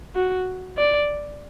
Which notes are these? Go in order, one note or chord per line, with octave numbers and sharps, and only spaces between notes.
F#4
D5